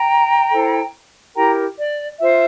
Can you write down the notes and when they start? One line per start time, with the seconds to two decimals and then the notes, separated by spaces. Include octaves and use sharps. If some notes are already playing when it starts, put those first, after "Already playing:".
Already playing: G5 A#5
0.52 E4 A4 C5
1.35 E4 G4 A#4 G5 A#5
1.77 D5
2.19 F4 C5 E5